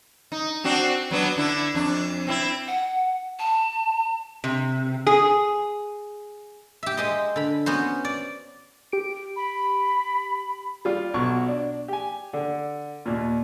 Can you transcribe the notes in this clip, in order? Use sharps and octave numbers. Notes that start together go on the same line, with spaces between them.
D#4
C4 D4 F#4
F#3 B3 D4
D3 D4 E4
F2 D4
C4 C#4 E4
F#5
A5
C3
G#4
G4 E5
G#3 C5 D#5
D3 B5
B3 C#4 F#4 C5
D5
G4 D7
B5
G3 F4
B1 B2 C#6
D4
G4 G#5
D3
D#2 A#2